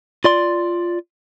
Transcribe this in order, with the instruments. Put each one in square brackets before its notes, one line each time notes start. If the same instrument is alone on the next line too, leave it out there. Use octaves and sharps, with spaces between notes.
[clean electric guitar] F4 D5 C6